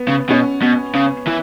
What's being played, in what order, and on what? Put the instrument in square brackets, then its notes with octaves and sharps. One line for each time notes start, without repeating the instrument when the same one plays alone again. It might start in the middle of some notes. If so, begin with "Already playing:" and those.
Already playing: [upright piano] B3
[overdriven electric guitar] C#3
[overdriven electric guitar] B2 [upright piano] C#4
[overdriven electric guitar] B2
C#3
E3